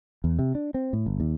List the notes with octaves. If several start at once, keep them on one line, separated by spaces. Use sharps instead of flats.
E2
C3
D4
C4
A2
G1
D#2